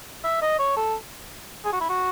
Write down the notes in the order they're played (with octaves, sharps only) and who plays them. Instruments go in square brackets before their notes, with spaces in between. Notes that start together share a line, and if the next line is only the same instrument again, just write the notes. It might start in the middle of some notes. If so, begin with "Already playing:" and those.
[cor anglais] E5
D#5
C#5
A4
G#4
F#4
E4
F#4